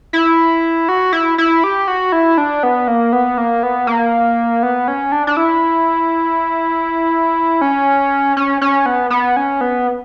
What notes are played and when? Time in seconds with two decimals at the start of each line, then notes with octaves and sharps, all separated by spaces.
0.13 E4
0.89 F#4
1.13 E4
1.38 E4
1.64 G4
1.88 F#4
2.12 E4
2.38 D4
2.63 B3
2.88 A#3
3.13 B3
3.38 A#3
3.63 B3
3.87 A#3
4.63 B3
4.88 C#4
5.12 D4
5.27 D4
5.37 E4
7.61 C#4
8.37 C#4
8.61 C#4
8.86 B3
9.10 B3
9.37 C#4
9.61 B3